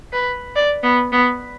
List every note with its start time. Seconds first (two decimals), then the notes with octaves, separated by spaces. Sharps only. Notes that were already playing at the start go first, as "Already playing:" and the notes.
0.12 B4
0.56 D5
0.83 B3
1.12 B3